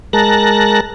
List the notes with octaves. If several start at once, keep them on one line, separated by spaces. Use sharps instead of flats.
G#3 A#4 A5 F#6 A#6